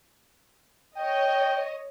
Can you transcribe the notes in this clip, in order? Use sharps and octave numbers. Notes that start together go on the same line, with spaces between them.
C#5 D#5 G5